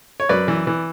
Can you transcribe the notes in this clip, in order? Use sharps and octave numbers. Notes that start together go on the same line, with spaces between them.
C#5
F#2 B4 D5
E3
E3